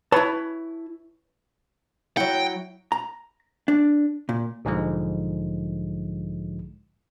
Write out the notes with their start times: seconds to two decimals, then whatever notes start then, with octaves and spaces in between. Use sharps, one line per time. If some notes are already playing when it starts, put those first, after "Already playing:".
0.12 E4 B4 C#5 A5
2.17 F#3 E4 F#5 G5
2.92 A#5
3.68 D4
4.29 A#2
4.65 B1 G#2 D3 F3 G#3